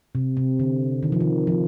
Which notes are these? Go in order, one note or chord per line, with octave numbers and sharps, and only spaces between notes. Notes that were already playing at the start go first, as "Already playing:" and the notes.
C3
C3
D3
D#3
F3
D#3
F3